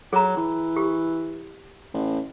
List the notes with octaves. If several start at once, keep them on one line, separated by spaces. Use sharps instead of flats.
F#3 G#4 A#5
E3
G4
A1